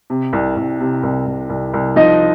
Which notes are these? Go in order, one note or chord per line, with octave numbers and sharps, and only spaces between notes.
C3
C2
C2
C3
C2
C2
C2
C2
F3 D#4 D#5